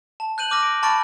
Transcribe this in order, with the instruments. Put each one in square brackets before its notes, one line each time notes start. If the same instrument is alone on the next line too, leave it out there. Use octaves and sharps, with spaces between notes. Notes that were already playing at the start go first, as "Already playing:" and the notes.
[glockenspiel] A5
F#6 G6 D#7 F#7
D6 F6 A#6
D7
A5 B5 C#6 F6 A6 D7